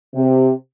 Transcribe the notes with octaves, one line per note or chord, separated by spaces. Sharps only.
C3